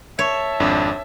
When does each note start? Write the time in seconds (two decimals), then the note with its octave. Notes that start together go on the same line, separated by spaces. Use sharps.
0.19 C#5 E5 A5
0.60 G#1 F2 D4